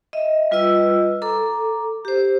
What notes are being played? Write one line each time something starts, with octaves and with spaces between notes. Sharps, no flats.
D#5 E5
G3 F4 B4 D#5 E6
A4 A#5 D6
G4 C5